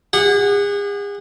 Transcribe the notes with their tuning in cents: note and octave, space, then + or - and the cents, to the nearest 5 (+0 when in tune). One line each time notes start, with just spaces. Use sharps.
G#4 -40 F#5 +0